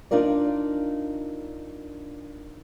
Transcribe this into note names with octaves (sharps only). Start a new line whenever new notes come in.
D4 D#4 F4 A#4 D5